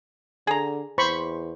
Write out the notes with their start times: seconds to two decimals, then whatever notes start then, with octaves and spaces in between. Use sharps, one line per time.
0.47 D3 G#4 A#5
0.98 E2 C5 B5 C#6